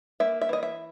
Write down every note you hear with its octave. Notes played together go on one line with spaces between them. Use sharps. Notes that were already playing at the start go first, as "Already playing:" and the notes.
A#3 E5
E5
E3 D#5
E5